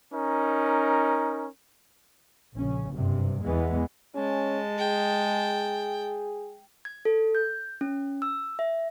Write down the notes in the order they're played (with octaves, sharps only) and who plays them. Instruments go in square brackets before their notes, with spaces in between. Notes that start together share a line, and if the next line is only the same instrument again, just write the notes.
[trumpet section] C#4 D#4 A#4
[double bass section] A#1 C#3 C#4
F#1 G2 C3
E2 E3 G#3 B3
[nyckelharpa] G#3 A5 [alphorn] C#4
[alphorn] G#4 [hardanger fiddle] G5
[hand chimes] G#6
A4
G6
C#4
E6
E5